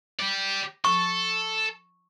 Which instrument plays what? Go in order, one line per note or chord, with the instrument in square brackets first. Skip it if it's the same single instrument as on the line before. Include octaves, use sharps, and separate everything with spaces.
[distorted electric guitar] G4 D5
[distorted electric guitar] A4 [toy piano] C#6